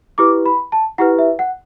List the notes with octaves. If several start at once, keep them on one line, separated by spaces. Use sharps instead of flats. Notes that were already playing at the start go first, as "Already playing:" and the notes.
E4 G4 B4 D6
B5
A5
E4 G4 B4 F#5
E5
F#5